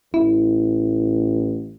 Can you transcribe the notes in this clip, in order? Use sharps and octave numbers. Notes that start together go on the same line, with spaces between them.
A1 E4